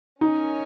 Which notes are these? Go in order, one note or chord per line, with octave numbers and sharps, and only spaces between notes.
C#4 D#4 A#4 C#5 G#5